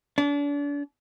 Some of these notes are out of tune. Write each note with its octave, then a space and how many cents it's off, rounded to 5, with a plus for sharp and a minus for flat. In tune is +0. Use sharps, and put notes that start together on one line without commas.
D4 -35